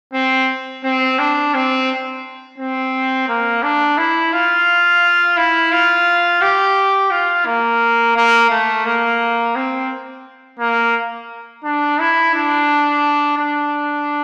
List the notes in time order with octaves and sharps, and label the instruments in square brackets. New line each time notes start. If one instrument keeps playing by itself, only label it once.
[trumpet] C4
C4
D4
C4
C4
A#3
D4
E4
F4
E4
F4
G4
F4
A#3
A#3
A3
A#3
C4
A#3
D4
E4
D4
D4